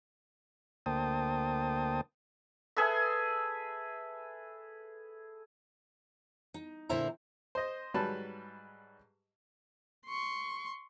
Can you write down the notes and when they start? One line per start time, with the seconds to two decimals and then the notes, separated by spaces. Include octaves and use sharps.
0.86 D2 A#3 C5 G5 A5 D#6
2.77 G#4 A4 B4 E5
6.54 D#4
6.89 A#2 D3 E4 C5 E5 A#5
7.55 C5 D#5
7.94 G#2 F#3 G3 B4 A5 B5
10.06 C6 C#6